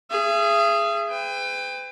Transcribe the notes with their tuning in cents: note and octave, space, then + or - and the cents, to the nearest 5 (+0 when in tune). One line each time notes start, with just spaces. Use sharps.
G#4 +0 E5 +45
B4 +45 G5 +30